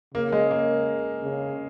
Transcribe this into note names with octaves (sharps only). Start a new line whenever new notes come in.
C#3 A#3
G#3
A#3
C#3